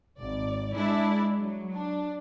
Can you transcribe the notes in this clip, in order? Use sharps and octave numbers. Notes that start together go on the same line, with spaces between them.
G#1 D5
G#3 D4 E4 D5
F#3
D4